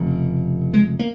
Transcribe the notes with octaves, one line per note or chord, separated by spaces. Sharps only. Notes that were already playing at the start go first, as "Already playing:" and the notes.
Already playing: F1 F2 C#3
G#3
A#3